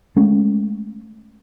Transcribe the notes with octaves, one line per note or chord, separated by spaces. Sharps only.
G#3 A3 C#4